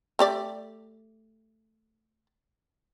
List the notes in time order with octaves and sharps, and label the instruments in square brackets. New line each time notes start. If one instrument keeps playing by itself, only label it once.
[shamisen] A3 G4 D5